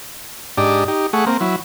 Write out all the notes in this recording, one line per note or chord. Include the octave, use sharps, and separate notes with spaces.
G#2 D4 G4 D5 D#5
D#4 G4
A3 G#4 F#5 C#6
A#3 C4
F#3 E4